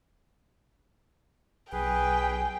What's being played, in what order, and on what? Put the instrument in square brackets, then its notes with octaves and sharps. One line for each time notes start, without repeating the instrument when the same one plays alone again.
[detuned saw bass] B1 [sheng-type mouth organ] G#4 B4 [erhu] G5 [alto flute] G#5